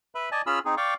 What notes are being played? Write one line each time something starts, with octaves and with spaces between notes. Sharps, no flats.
B4 E5 B5
D5 D#5 G#5 A5
C#4 F4 G#4 B5 E6 F6
C4 D#4 G#4
D5 F5 G5 C#6 D6